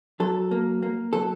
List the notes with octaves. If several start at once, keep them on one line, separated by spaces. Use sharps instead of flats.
F#3 A4
A#3
A#3
F#3 A4